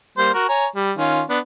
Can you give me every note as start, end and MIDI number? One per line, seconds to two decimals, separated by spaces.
0.18 0.30 55
0.18 0.30 58
0.18 0.30 72
0.34 0.45 66
0.34 0.45 70
0.49 0.66 73
0.49 0.66 80
0.49 0.66 82
0.75 0.92 55
0.97 1.22 51
0.97 1.22 61
0.97 1.22 65
1.29 1.39 59
1.29 1.39 62